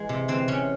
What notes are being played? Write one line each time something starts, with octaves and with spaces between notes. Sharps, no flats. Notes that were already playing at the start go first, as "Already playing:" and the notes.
Already playing: E3 G#3
C3
E3 C4
C3 C#4